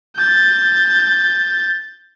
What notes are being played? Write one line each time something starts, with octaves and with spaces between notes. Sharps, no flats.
G6 A6